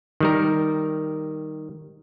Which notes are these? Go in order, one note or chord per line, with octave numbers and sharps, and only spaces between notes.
D#3 G3 A#4